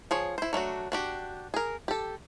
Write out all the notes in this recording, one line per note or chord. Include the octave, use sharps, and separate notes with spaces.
F3 G#4 C#5
E4 C5
F#3 A3 D4 F#4
D4 F#4 G4
G#4 A#4
G4 A4